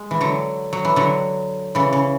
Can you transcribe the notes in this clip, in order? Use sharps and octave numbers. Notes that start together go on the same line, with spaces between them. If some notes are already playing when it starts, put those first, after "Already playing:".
Already playing: G#3
E3
D3 F#3
F#3
E3
D3 F#3
C#3 E3
C#3